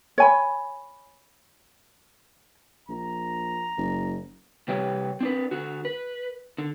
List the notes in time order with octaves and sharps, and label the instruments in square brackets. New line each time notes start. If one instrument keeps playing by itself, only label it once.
[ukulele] C#5 G#5 B5
[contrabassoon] A#1 [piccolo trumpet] A#5
[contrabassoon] F#1
[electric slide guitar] C3 G3 G4 B4 C#5 G5
C4 D4 B4
D3 F#4
B4
D3